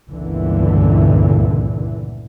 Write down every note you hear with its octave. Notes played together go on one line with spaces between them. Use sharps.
G1 C#2 A#2 D3 E3